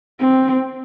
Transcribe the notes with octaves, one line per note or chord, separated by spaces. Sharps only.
C4